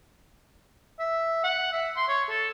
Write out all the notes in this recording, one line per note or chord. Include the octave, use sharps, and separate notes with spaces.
E5
F#5
E5
C6
C#5
A4